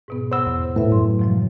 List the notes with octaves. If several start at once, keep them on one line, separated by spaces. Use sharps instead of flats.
G#2 B2 B3
C5 C#5 F#5 B5 E6
E2
A2 B4 E5
F#2 F#3 C6
C3 F3 G3